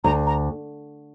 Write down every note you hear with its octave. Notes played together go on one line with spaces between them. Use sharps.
D2 A#5
A#5